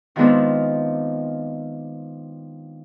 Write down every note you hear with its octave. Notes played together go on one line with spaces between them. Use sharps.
D#3 F3 G#3 B3 C4 D4